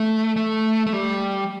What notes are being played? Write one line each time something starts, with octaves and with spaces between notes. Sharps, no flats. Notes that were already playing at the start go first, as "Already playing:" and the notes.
Already playing: A3
A3
A3
G3